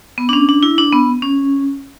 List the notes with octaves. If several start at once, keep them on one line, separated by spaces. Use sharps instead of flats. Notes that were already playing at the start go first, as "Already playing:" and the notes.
B3
D4
C#4
D4
E4
D4
B3
C#4